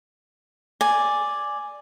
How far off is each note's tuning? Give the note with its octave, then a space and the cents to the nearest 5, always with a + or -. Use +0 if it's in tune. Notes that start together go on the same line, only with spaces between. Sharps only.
D5 +0 G#5 +0